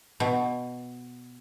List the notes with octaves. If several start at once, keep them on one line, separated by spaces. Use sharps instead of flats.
B2